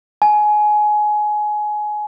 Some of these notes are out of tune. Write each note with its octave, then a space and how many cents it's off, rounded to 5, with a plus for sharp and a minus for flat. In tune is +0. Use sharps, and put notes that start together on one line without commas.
G#5 +20